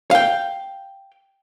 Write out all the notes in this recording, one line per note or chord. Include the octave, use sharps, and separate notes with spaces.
F5 G5